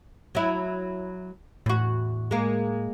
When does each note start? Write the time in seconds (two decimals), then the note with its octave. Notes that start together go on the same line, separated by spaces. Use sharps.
0.35 F#3 E4
1.66 E2 A2 F#4
2.31 G#3 A#3